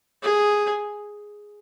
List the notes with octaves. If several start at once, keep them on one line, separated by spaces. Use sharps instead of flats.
G#4